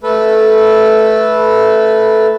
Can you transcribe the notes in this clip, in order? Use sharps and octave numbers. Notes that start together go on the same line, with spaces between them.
A3 A4 B4